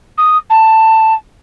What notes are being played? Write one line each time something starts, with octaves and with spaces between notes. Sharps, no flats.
D#6
A5